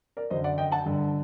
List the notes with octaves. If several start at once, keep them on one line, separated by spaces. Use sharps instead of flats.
A#4 D5
F#2 D3 C5 D#5
D5 F#5
D#5 G5
F#5 A5
G2 D3